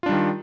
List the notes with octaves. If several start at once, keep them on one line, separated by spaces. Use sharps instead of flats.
D#3 G3 D4 F4